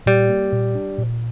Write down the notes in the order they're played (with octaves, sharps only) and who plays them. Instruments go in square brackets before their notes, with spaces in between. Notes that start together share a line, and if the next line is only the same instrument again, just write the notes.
[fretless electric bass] A#2 [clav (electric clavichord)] G3
[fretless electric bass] A#3
A#2
D4
A#2